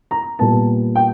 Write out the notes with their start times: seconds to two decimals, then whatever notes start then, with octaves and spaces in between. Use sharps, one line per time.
0.11 A#5
0.39 A#2 G3 B3 A5
0.95 G5